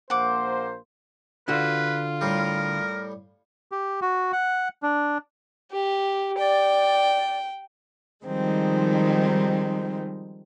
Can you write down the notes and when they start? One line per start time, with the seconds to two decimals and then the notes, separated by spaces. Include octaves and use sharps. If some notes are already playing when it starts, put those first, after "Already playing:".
0.10 A#1 A#3 C5 F#5 D6
1.48 D3 F4 F#4 B4
2.21 A2 G3 A#4
3.72 G4
4.02 F#4
4.32 F#5
4.83 D4
5.72 G4
6.38 D5 G5
8.25 D#3 F3 G3 G#3 C4 D#4